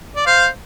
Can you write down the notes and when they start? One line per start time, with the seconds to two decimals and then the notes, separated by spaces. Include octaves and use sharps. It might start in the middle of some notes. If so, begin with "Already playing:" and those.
0.16 D5
0.26 C5 F5